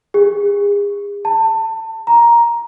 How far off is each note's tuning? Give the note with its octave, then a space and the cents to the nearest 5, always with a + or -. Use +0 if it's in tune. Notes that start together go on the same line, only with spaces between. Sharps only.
G#4 -40
A5 +25
A#5 +10